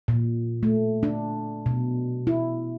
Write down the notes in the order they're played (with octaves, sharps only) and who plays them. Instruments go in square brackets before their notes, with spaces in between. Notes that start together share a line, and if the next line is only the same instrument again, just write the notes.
[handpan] A#2
A3
D4
B2
E4